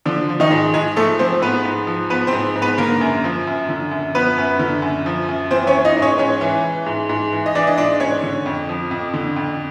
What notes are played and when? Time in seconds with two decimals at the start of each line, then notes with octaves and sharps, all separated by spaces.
0.06 D3 F3 D4
0.29 F3
0.40 D#3 D#4
0.51 G#2
0.74 G#2 G#3 G#4
0.96 F3 A3 A4
1.19 F3 C4 C5
1.42 G#2 B3 B4
1.65 G#2
1.87 F3
2.10 F3 B3 B4
2.27 C4 C5
2.32 G#2
2.56 G#2
2.62 B3 B4
2.78 D3 A#3 A#4
3.01 F#2
3.24 F3
3.47 F#2
3.69 D3
3.91 F#2
4.15 F3 B3 B4
4.38 F#2
4.59 D3
4.82 F#2
5.06 F3
5.29 F#2
5.51 E3 C4 C5
5.67 C#4 C#5
5.73 E3
5.85 D#4 D#5
5.96 G#2
6.02 C#4 C#5
6.18 G#2 C#4 C#5
6.41 E3
6.64 E3
6.86 G#2
7.09 G#2
7.33 E3
7.46 D#5
7.55 E3 D4 D5
7.67 D#5
7.77 G#2 D4 D5
8.00 G#2 C#4 C#5
8.23 D3
8.46 F2
8.69 F3
8.91 F2
9.14 D3
9.36 F2